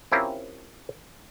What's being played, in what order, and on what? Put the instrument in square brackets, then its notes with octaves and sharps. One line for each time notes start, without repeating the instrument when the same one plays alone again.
[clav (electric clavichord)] C4 C#4 E4 F4 G4 A#4